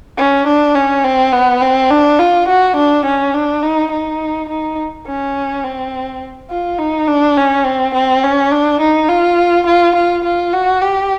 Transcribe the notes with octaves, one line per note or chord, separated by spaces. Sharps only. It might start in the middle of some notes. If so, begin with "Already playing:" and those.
C#4
D4
C#4
C4
B3
C4
D4
F4
F#4
D4
C#4
D4
D#4
D#4
D#4
C#4
C4
F4
D#4
D4
C#4
C4
C4
C#4
D4
D#4
F4
F4
F4
F4
F#4
G4